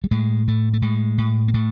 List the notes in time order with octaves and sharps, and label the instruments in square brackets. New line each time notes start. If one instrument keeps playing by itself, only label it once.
[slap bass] G3
A2 G#3
A2 A3
A3
A2 G#3
A2
A#3
A2 A3